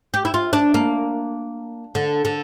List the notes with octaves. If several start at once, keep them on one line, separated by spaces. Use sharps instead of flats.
G4
E4
F4
D4
A#3
D3
D3